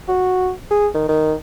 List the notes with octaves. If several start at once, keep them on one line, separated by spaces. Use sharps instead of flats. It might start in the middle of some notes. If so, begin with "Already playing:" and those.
F#4
G#4
D#3
D#3